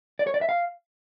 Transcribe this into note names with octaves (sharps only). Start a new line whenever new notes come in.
D5
C#5
D5
E5
F5